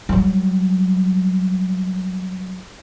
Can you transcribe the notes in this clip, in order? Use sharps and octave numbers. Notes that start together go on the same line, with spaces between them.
F#3 G3